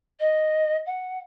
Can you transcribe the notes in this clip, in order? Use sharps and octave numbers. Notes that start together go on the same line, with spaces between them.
D#5
F#5